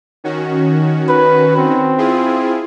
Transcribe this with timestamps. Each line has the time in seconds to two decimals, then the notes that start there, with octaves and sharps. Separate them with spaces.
0.24 D#3 C#4 F#4
1.09 B4
1.57 C4
1.98 E4 F4 G#4